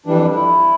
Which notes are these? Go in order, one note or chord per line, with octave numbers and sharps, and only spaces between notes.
F2 E3 G3 D4
D4
E4